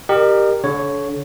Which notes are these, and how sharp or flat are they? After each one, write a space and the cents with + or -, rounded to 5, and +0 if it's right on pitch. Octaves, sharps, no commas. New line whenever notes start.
G4 +0 A#4 -5 D#5 -45
D3 -35 C#5 +0